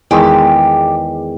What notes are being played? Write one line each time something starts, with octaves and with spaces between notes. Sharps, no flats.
E2 D#3 G#3 G4